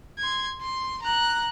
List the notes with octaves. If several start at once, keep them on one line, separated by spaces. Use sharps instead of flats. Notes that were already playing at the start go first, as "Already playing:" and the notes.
C6 G#6
C6
A#5 F#6